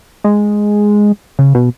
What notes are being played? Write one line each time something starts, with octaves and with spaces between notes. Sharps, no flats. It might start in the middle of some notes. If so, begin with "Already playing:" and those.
G#3
C#3
B2